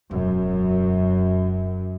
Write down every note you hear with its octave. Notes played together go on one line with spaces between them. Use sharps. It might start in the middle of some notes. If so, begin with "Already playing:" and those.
E1 F#2